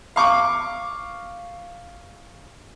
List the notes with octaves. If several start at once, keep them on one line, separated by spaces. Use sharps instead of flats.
F5 C#6 D6